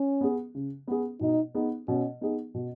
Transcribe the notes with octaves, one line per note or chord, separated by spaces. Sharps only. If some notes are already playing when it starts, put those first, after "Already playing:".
Already playing: C#4
B3 G#4
C#3
B3 G#4
B2 D#4
B3 D#4 G#4
B2 C#4
B3 D#4 G#4
B2